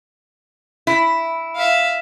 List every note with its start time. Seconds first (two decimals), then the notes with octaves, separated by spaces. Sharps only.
0.87 E4
1.56 E5 F5